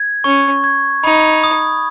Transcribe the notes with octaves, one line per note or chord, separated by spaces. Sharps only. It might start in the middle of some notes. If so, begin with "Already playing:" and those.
Already playing: G#6
C#4 C#6
G#6
D#4 B5
D#6